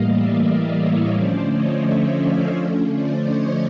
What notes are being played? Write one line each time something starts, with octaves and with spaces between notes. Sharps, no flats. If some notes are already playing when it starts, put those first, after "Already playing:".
Already playing: A2 E3 G3 A#3 D#5 F5
D5 E5
D5 E5
C#5 D#5
D3 F3 A3 C#4 C5 D5
C#5 D#5
D5 E5
D#5 F5
D3 F3 A3 C#4
C5 D5
C#5 D#5